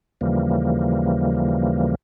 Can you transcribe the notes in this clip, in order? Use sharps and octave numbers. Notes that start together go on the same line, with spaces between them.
D#2 C#3 E3 F3 G3 A#3